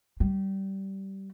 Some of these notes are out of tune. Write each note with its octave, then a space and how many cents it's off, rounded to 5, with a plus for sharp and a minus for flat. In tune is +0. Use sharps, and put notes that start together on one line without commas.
G3 -20